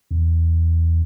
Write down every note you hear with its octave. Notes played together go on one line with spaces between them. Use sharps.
E2